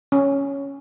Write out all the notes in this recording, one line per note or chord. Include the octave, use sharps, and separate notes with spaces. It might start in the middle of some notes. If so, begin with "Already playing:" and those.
C#4